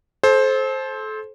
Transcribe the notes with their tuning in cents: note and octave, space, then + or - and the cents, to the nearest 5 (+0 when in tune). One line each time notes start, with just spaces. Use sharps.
A4 -30 C5 +10